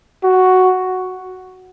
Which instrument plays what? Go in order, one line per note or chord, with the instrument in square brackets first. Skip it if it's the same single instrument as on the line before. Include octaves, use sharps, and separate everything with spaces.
[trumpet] F#4